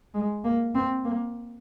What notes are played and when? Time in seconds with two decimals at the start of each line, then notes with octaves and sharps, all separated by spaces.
0.14 G#3
0.44 A#3
0.75 C4
1.04 A#3